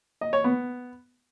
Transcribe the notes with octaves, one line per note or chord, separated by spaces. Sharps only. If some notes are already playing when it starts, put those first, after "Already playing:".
D#5
C#5
B3